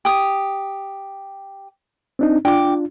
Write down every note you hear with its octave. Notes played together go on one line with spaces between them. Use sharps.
G4 D#6
C4 D4 D#4
D4 F4 G5 D6